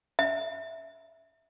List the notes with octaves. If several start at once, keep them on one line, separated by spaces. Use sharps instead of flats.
E5